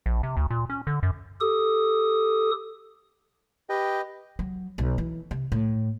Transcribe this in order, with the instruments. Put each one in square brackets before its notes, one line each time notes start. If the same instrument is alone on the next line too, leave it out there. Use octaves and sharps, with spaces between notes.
[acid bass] A#1
C3
D2
A#2
C#4
D3
F#2
[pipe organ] G4 A4 D#6
[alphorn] G4 [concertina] B4 D#5 G5
[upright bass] F#3
B1
E3
C3
A2